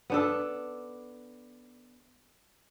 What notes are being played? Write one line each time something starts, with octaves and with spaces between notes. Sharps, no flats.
B3 D4 A4